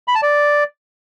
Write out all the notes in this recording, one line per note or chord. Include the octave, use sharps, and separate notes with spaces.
B5
A5
D5